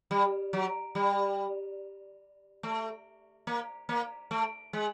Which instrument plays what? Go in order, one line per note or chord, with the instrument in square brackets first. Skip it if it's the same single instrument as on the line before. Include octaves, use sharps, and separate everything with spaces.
[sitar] G3
F#3
G3
A3
A#3
A#3
A3
G#3